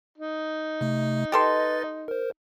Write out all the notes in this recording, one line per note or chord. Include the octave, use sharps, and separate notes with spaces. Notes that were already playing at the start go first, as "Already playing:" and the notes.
D#4
C3 A3
G4 A4 B4 D#5 C6 A6
A#4 C5